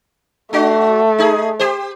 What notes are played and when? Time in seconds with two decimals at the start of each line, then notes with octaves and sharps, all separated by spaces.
0.53 A3 D4 F#4
1.18 D#4 G#4
1.59 G4 C5